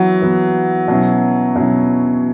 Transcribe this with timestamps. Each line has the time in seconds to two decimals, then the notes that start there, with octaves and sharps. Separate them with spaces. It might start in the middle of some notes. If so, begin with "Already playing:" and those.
Already playing: E3 F#3 B3 E4
0.21 E3 B3 E4
0.88 B2 F#3 C#4 E4
1.56 B2 F#3 C#4 E4